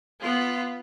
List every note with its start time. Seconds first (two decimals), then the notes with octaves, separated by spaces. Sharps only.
0.21 B3 F4